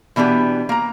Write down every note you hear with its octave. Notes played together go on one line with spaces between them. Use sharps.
B2 E3 B3 D4 G4
A#3 A#5